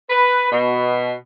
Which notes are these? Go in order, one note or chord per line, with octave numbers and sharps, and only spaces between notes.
B4
B2